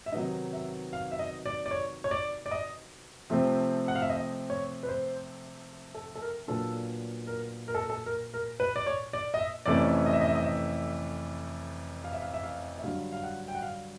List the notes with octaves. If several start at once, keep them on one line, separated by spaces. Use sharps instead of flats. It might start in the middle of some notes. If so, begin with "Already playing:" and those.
E5
C3 D#3 F#3 B3 D#4 D#5
E5
F5
E5
D#5
D5
D5
C#5
C#5
D5
D5
D#5
C3 F3 A3 C4
F#5
F5
E5
D#5
C#5
B4
C5
A4
A4
A#4
A#2 F#3 B3 D4 F4 A4
A#4
A#4
A4
A4
A#4
A#4
B4
D5
C#5
D5
D#5
E5
F2 C3 E3 A3 C#4 D5
D#5
E5
D#5
E5
D#5
E5
F5
E5
F5
E5
F5
E5
G2 D3 F#3 F5
F5
F#5
G5
F#5
F5